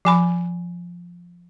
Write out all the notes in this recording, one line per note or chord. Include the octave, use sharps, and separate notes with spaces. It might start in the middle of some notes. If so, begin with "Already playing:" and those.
F3 G#5 B5